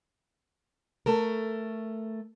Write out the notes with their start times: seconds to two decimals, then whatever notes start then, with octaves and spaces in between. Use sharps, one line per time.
1.06 A3 A4 A#4